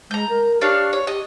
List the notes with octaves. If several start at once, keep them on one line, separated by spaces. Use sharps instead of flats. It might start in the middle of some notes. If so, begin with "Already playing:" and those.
G#3 A#5 G6
A#4
D4 G4 C#5 F5
C#5
G4 D#5